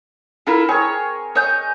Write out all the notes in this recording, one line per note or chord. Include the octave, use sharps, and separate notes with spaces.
E4 F4 A4 A#4
C4 G#4 C#5 G#5
C#5 D#5 G#5 G6